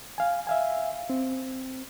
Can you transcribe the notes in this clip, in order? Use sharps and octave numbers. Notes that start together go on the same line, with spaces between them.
F5 G#5
E5 F5 G#5
C4